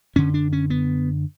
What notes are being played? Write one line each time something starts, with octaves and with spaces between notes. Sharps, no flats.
F#2 D3 C#4
D4
C#4
B3